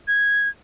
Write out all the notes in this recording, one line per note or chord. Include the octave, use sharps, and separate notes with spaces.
G#6